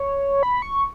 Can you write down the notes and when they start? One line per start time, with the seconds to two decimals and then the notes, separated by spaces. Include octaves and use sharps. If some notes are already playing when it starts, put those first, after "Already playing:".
Already playing: C#5
0.43 B5
0.62 C#6